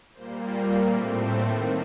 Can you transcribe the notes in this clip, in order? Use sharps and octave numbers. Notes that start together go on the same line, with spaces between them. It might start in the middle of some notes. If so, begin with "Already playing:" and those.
A#2 G3 A#3 C5
C5
A2 A3 C4
C5
D#3 A#3